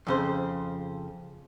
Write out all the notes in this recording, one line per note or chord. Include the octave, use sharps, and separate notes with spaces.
F2 C#3 C5